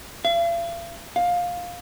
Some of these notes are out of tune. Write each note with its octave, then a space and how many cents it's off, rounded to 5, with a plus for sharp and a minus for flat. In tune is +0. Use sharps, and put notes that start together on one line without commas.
F5 -45
F5 +15